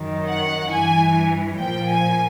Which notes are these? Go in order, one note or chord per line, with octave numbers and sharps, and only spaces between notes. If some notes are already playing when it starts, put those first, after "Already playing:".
Already playing: F#2 D#3
F#5
G2 E3 G#5
A#2 F3 G5
G#5